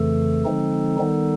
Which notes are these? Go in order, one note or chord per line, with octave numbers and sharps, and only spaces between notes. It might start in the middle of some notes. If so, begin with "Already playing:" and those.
Already playing: F2 C#3 E3 A3 A4
D3 F3 G#3 C4 D#4
D#3 G3 B3 D#4